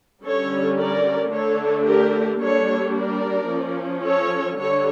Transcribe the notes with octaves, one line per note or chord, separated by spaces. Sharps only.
D3 G3 C#4 A4 C#5
A#4 D5
D3 A3 D4 A4 C#5
G4 A#4
G3 A#3 D4 A4 C#5
A#4 D5
F3 C#4
A4 C#5
D3 G3 A4 C#5